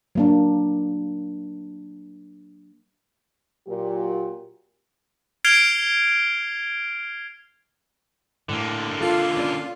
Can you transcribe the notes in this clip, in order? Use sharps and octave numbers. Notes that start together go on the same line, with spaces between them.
F#3 A#3 D4
A#2 F#3 G4
F6 G#6 C7 D7 F7 G7
A2 D3 A#3
F4 A4
C#4 D5